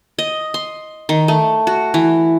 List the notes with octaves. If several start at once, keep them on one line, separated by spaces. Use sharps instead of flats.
D#5
C6
D#3
A3
F#4
E3